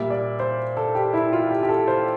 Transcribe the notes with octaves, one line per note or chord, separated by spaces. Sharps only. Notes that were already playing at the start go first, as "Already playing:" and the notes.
Already playing: A#2 G3 E5
D5
C5
A4
G4
E4
F4
G4
G4
A4
C5